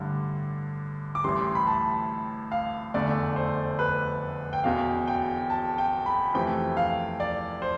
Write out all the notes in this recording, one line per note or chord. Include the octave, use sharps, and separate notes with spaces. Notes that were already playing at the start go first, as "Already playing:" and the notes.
Already playing: A1 G2 D3
D6
A1 A2 E3 G3 C6
B5
A5
F5
F1 E2 D3 A3 D5
C5
B4
G5
E1 E2 B2 F5
G5
A5
G5
B5
F2 C3 E3 A3 G5
F5
D5
C5